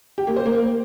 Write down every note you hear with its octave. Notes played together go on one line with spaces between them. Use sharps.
G4
A#3
C5
A#3